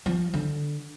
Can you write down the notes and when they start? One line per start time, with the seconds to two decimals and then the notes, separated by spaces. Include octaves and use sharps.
0.06 F3
0.34 D3